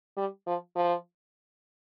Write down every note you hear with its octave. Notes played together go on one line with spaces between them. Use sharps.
G3
F3
F3